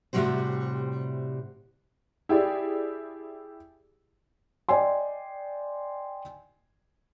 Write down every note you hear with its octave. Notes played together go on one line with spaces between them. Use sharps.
A2 C3 D#3 G3 F#4 C5
E4 G4 G#4 D5
D5 D#5 G5 G#5 C6